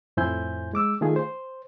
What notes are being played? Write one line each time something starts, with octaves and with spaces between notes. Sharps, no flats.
F2 A2 E4 C5 G#5 G6
G#3 D6 E6
D#3 A3 F4 G#4
C5